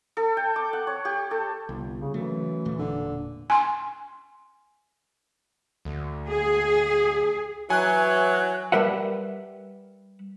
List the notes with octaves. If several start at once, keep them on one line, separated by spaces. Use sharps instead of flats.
A4
G5
D6
F#5
C#5
G4
A4
G1 C2
C#3
F#2 E3 A3
D2 A#2 A3
E1 A#2 D3 D4
G#5 C6
D2
G#4
E3 F#3 G#5 F#6
G3 A#4 B4 E5 F#5